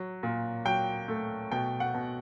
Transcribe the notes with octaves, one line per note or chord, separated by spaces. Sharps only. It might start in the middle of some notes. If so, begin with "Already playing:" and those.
Already playing: F#3
A#2
F#3 G5
A3
B2 G5
F#5
B2